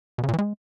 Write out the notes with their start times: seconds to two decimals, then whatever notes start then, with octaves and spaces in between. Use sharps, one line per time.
0.18 B2
0.23 C#3
0.28 A#2
0.33 E3
0.39 G#3